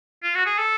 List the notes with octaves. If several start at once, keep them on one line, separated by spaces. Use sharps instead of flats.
F4
F#4
G#4
A4